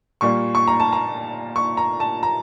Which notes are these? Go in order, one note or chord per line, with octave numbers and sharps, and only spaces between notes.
A#2 G3 A#3 C#6
C#6
A#5
A5
A#5
C#6
A#5
A5
A#5